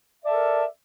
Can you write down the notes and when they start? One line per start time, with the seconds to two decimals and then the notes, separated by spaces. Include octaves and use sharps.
0.21 E5
0.24 D5
0.26 A5
0.29 A4
0.32 A#4